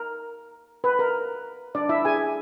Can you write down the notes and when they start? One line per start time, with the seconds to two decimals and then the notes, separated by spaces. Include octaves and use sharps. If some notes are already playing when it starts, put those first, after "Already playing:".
Already playing: A#4
0.84 B4
0.99 A#4
1.75 D4 D5
1.89 E4 E5
2.05 G#4 G#5